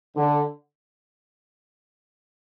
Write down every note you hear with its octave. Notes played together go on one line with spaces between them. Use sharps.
D3